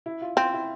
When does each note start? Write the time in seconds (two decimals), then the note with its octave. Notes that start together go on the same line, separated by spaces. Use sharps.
0.06 E4
0.22 F4
0.37 C4 F4
0.54 E4